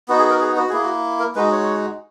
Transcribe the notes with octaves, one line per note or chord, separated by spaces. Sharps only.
B3 D#4 F#4
G#4
A#4
G#4
F#4
A#3 E4 G#4
F#4
A#4
G#3 D#4 F#4 B4
C#5